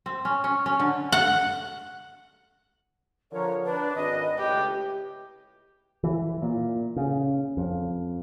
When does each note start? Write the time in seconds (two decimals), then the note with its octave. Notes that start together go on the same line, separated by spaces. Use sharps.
0.06 C4
0.25 C#4
0.44 C#4
0.66 C#4
0.79 D3
1.12 F#5
3.31 D3 F3 A#4 C#5
3.64 D4 B4
3.95 G#1 D#5
4.38 C#2 A2 G4
6.04 E3
6.42 A#2
6.97 C#3
7.57 F2